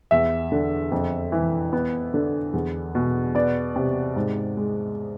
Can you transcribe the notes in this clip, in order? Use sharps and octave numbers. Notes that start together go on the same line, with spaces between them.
E2 E5
D3
F2
E3
B3
D3
E2
B2
B3 D5
C3
G#2
G#3